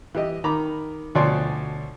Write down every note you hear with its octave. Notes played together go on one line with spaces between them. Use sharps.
E3 G4 D#5
D#3 A#5 B5 D6
D2 B2 F3 C#5 D5 C6